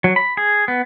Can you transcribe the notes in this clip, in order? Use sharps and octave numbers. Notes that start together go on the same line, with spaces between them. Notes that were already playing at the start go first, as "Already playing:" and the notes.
F#3
B5
G#4
B3